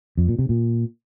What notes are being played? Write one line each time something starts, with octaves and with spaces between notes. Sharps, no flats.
F2
A#2
C3
A#2